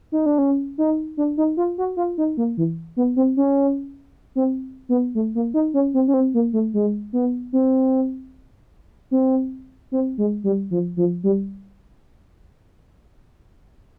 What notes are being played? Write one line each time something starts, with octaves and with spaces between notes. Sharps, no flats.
D#4
D4
C#4
D#4
D4
D#4
F4
F#4
F4
D#4
A#3
E3
B3
C4
C#4
C4
B3
A3
A#3
D#4
C#4
C4
C#4
C4
A#3
A3
G#3
B3
C4
C4
C4
G#3
G3
F3
F3
G3